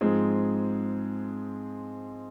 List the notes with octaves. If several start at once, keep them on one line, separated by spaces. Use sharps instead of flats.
G#2 F3 G#3 C4 G#4